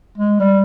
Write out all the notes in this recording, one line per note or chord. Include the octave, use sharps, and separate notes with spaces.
G#3
G3